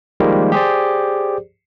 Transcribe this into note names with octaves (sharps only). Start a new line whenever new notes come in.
D#3 F3 G3 G#3 A#3
G4 G#4 C5 D5